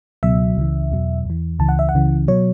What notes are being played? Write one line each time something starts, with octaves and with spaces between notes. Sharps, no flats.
C#2 B2 F#3 E5
C#2 C#3 E3
E2 B2 F#3
E2 E3
C#2 C#3 E3 A5
F#5
E5
F#5
C#2 C#3 E3
B2 F#3 C#5